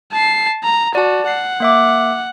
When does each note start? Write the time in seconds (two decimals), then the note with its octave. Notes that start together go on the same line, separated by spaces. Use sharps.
0.13 A5 C7
0.64 A#5
0.95 F#4 D5 A5
1.28 F#5 C7
1.60 A#3 E5 D6